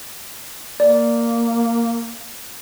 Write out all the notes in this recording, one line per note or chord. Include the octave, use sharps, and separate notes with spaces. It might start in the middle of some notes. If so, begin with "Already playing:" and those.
A#3 D5